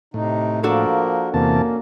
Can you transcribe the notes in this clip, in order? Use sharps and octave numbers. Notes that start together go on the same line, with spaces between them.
A2 C3 D#4
F3 A#3 D4 F#4 A4 A#4
E2 C3 A#3 C#4 A5